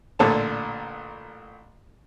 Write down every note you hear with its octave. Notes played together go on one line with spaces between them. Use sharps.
A1 A#2 D3 A5